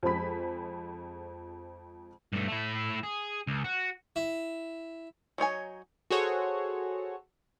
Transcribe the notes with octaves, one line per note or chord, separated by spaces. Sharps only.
F2 F3 G#3 G#4 B5 B6
G2 A3
A3 E4
G#4
C#2
F#4
E4
F#3 D#4 C#5 G#5
F#4 G#4 A4 C5 C#5 F#5